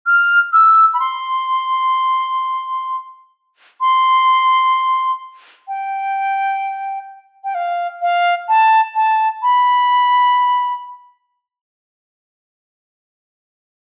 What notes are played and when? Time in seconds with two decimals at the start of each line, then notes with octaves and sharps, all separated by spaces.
0.06 F6
0.53 E6
0.94 B5
1.00 C6
3.81 C6
5.68 G5
7.44 G5
7.55 F5
8.02 F5
8.48 A5
8.96 A5
9.42 B5